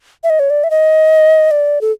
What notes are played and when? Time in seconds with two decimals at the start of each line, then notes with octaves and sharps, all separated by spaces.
0.24 E5
0.30 D#5
0.40 C#5
0.50 D5
0.64 E5
0.71 D#5
1.51 D5
1.81 A4